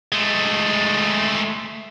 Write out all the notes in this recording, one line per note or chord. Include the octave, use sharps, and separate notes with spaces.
G#3 A3